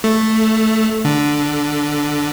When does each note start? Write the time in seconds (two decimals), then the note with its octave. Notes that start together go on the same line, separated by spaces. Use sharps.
0.04 A3
1.05 D3